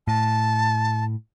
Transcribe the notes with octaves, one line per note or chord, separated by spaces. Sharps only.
A2 A5